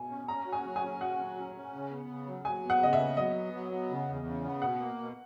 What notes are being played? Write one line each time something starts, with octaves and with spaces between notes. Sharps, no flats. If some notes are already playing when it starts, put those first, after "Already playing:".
Already playing: B2 G#5
C#4
C#4 A#5
F#4
G#5
F#3
G#5
C#4
F#4 F#5
F#3
C#4
C#4
C#3
B3
C#3
F#3
F#3 G#5
B3
F#5
C#3 D#5
E5
B3
F#3 D#5
B3
F#3
B3
C#3
E2
C#3
B3
B2 F#5
A#3
B2